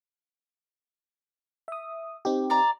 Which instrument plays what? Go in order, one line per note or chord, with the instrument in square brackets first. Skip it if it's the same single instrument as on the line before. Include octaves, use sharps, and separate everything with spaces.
[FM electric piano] E5 D#6
C4 D#4 G4
[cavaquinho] D5 A#5